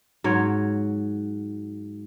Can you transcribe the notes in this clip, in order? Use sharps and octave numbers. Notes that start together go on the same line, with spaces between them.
G#2 F#3 C#5